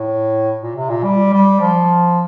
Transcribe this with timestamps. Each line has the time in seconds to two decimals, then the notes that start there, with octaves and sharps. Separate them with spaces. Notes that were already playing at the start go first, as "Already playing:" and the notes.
Already playing: A2
0.61 A#2
0.75 C3
0.90 A#2
1.04 G3
1.33 G3
1.61 F3